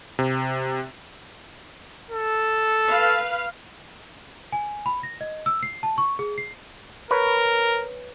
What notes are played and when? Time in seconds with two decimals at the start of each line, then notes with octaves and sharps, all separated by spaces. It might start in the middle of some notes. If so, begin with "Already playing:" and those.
0.19 C3
2.10 A4
2.89 B4 F5
4.52 G#5
4.86 B5
5.03 A#6
5.21 D#5
5.46 E6
5.63 C7
5.83 A5
5.98 C#6
6.19 G#4
6.38 C7
7.11 A#4 B4 C#5